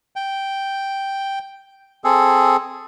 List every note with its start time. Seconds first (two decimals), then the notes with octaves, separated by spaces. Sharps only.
0.16 G5
2.04 C4 G#4 A4